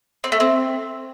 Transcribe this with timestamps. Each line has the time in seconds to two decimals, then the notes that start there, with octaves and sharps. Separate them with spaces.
0.24 C4
0.32 A3
0.40 C4